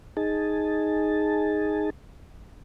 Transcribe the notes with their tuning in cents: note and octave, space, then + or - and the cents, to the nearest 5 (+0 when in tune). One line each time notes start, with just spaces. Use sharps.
D#4 +0 G#4 +0 A5 +0